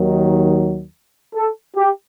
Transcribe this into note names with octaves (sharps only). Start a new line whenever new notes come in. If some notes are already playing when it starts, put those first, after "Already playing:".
Already playing: D#2 D#3 F#3
A4
G4